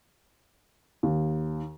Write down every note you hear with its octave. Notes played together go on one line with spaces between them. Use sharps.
D#2